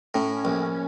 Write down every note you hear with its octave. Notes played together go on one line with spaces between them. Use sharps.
A2 C#4
A#1